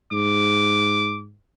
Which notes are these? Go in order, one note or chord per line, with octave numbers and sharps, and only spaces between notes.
G#2 D6